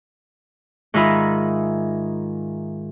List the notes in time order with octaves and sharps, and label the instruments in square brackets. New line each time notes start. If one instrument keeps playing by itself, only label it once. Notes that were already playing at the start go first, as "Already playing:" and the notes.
[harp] G#2 D#3 D#4 F4 E5 B5